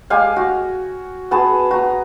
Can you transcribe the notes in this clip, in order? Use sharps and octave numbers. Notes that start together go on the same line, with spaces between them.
G#3 G4 F5 G#5
F#4
B3 F#4 G#4 A5
F#4 A#5